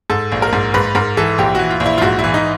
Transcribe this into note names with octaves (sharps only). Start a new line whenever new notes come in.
G#2 A4
A#1
A#4
G#2
G#2 B4
G#2 A#4
E3 A4
A#1 G4
E3 F#4
F4
A#1
E4
F4
G#2 F#4
E4
E3
D#4